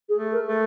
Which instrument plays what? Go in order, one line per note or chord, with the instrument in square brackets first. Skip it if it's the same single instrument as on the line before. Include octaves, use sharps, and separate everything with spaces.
[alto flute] G#4
[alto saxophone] A3
[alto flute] A#4
[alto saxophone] A3